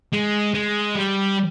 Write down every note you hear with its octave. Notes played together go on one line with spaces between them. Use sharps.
G#3
G#3
G3